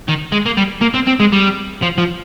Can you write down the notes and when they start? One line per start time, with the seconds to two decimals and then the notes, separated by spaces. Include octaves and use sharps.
0.09 D#3
0.32 G#3
0.46 A#3
0.58 G3
0.82 A#3
0.95 C4
1.07 C4
1.20 G#3
1.32 G3
1.82 F3
1.98 F3